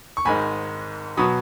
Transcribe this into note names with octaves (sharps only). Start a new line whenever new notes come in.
C#6
G#1 G#2 D#3 G#3 G#5 B5
B2 F#3 B5 D#6